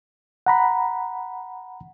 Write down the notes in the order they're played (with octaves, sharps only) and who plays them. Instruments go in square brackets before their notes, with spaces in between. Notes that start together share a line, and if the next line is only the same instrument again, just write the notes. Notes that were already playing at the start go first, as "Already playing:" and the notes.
[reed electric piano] F#5 A#5 B5